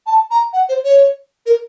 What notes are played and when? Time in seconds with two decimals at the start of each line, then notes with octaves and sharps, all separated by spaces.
0.06 A5
0.30 A#5
0.53 F#5
0.68 C5
0.83 C#5
1.46 A#4